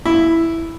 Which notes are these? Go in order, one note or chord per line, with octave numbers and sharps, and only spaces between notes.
E4